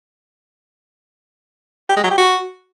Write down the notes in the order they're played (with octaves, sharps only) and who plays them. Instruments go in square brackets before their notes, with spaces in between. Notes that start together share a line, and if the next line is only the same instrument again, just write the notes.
[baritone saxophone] G4
G#3
F#3
G4
F#4